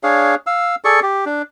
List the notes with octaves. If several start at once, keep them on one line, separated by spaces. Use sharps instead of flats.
D4 G#4 C#5 F5
F5 E6
G#4 A4 D5 C#6
G4
D4